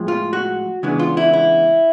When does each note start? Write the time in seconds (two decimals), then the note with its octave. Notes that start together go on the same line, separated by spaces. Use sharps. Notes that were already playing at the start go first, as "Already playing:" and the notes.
Already playing: A2 F3 G#3
0.08 F4
0.33 F#4
0.83 C#3 E3 G#3 B3 D4
0.99 F4
1.17 E4
1.33 E4